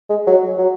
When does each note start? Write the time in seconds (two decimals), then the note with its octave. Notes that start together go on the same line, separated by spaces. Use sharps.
0.10 G#3
0.27 F#3
0.58 F#3